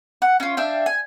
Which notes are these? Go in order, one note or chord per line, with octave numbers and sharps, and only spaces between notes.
F#5
C#4 F4
D4 E5 F5 G5
G#5